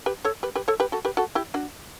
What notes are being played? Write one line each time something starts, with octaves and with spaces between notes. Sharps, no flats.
G4 B4
A4 C#5
G4 B4
G4 B4
A4 C#5
G4 B4
F#4 A4
G4 B4
F#4 A4
E4 G4
D4 F#4